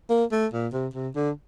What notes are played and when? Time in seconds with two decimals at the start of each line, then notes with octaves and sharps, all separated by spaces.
0.10 A#3
0.32 A3
0.53 A#2
0.73 C3
0.94 C3
1.16 D3